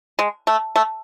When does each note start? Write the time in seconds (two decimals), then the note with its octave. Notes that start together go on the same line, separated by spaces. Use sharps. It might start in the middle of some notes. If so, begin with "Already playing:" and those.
0.19 G#3
0.47 A3
0.76 A3